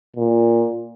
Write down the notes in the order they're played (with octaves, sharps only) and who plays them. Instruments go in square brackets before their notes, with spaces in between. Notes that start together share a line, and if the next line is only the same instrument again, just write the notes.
[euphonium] A#2